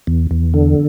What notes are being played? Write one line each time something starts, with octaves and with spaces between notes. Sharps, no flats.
E2
E2
D3